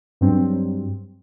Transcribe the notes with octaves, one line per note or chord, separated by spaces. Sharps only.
G2 F#3 C4